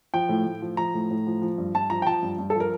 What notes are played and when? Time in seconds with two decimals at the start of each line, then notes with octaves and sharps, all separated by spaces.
0.14 F3 G5
0.29 A2
0.46 A2
0.62 F3
0.77 F3 A#5
0.94 A2
1.11 A2
1.27 F3
1.42 F3
1.58 G2
1.75 G2 A5
1.90 F3 A#5
2.02 G5
2.06 F3 A5
2.22 G2
2.38 G2
2.50 A4
2.55 F3 A#4